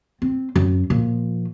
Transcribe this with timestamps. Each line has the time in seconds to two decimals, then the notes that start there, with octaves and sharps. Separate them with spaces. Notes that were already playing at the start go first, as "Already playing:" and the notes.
0.22 C4
0.56 F#2
0.90 A#2 F3